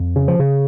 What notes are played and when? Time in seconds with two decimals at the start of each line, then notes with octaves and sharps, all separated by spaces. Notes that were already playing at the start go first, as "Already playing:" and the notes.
Already playing: F2
0.16 C#3
0.28 F3
0.39 C#3